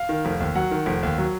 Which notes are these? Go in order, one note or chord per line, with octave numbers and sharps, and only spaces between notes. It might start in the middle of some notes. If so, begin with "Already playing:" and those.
Already playing: F5
D#3
F1
D#2
F#3 F#5
D#3
F1
D#2
F#3